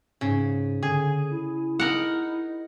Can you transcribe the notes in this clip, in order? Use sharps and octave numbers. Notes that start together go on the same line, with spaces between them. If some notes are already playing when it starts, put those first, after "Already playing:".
G#2 C#3
D3 G#4
E4
D#4 A#4 F#5